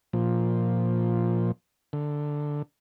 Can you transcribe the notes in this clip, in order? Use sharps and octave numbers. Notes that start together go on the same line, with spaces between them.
A#2 F3
D3